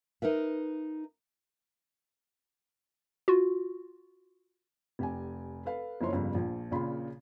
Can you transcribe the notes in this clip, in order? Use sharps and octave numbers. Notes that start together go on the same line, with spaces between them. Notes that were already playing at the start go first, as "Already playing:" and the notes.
D#4 A#4 B4 E5
F4 F#4
F1 G4 G#5
A4 B4 F5
F#1 F3 E4 C5 C#5 C6
G1 F2 C#3 G3
A#1 F3
A#1 A#2 C#3 B5 C6